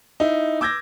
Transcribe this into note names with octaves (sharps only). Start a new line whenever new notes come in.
D#4 E4
D6 E6 G6 G#6 A#6